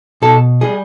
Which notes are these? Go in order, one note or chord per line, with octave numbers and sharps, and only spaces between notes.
B2 A4
G3 G#4